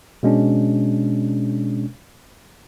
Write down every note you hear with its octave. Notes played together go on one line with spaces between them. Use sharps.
B2 G#3 C#4 D4